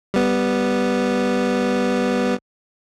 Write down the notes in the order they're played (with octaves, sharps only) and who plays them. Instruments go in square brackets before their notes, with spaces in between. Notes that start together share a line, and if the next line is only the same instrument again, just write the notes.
[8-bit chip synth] G3 B3